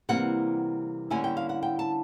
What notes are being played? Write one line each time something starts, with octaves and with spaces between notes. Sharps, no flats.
C3 E3 G3 A#3 F#5
D3 G3 A#3 C#4 E4 G#5
G5
F5
F#5
G5
A5